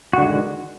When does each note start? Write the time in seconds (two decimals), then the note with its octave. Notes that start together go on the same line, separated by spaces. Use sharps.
0.13 F#4
0.18 D3
0.22 G#3
0.27 D#3